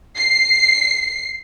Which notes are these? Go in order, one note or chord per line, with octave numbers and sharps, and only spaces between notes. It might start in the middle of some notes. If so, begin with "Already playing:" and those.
C7